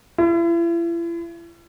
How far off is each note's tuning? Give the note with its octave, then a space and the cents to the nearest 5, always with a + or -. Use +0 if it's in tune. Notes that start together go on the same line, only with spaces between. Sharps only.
E4 +40